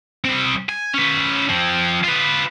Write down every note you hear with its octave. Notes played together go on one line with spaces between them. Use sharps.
G3 C4
G#5
C#4 B4
F3 C4
F4 B4